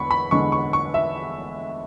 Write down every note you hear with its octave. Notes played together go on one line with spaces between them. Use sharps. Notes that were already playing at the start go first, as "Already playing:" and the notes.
Already playing: E2 D3 G#3 B5 C#6
B5
E2 D3 G#3 C#6
C#6
C#6
E5